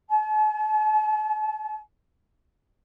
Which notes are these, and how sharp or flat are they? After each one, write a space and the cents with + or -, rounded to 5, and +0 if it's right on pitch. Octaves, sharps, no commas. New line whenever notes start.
A5 -45